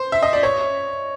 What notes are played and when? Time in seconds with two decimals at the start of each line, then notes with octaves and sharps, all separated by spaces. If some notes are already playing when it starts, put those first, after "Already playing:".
Already playing: C5
0.12 E5
0.23 D#5
0.33 D5
0.43 C#5